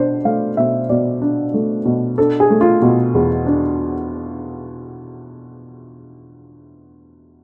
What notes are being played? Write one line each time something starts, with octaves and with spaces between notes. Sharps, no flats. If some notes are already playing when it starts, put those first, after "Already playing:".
Already playing: B2 D4 C5 D5
A3 F5
B2 E5
B2 D5
D4
A3
B2
D4 A4
G#4
A3
F4
B2
E2
D4